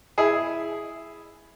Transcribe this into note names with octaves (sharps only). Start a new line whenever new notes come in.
E4 G#4